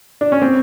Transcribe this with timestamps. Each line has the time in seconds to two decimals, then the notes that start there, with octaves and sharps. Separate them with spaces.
0.21 D4
0.32 C#4
0.42 C4